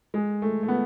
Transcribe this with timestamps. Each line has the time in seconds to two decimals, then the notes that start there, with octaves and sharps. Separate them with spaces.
0.14 G#3
0.42 A3
0.63 A3
0.68 B3